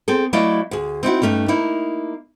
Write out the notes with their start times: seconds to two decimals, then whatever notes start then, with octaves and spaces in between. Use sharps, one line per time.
0.08 C4 G#4 A4
0.33 F#3 A3 E4 D5 D#5 F5
0.71 D2 G#4
1.03 C4 D#4 E4 F#4
1.22 G2 A#2 A3 C#4 D#4
1.48 A#3 D#4 E4